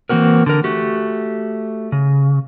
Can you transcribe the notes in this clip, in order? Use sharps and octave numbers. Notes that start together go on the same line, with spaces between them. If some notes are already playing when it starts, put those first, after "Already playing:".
E3 A#3 C4 F#4 A#4
D3 A#4
A3 F#4 G4
C#3